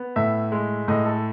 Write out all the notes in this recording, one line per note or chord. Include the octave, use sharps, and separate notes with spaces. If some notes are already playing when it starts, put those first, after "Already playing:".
Already playing: B3
A2 E5
G#3
A2 D#5
A4